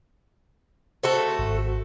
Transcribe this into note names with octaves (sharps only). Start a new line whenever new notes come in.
A3 F#4 A4 C5
G#1